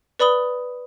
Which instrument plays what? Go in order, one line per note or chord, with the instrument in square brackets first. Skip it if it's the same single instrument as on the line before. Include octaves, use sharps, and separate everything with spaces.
[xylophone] B4 D5 B5 D#6 G7